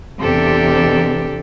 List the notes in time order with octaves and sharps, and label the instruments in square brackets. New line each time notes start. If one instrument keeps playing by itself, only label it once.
[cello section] E2 C3 [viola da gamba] D4 G4 A4